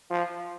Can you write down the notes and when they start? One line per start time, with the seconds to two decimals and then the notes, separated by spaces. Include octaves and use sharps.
0.11 F3